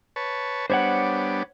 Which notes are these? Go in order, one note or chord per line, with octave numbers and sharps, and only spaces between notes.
B4 C#5 A5
G3 B3 D4 C5 C#5 F#5